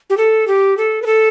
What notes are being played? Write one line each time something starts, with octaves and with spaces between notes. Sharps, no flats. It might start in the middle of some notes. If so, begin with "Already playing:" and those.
G4
A4
G4
A4
B4
A4